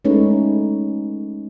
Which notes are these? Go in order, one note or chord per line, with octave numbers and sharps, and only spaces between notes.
G#3 A3 C#4 D#4 B4 C#5